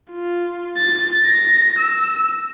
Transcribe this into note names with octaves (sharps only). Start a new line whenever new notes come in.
F4
A6
A#6
E6